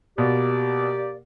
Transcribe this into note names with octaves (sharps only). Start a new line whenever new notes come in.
B2 A#3 G4 D5